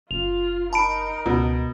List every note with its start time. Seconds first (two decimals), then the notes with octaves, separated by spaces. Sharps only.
0.11 F#1 F4 F5 F7
0.73 D#4 A#4 A5 B5 D7
1.26 C#2 B2